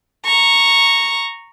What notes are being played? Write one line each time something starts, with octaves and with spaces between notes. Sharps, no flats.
A#5 C#6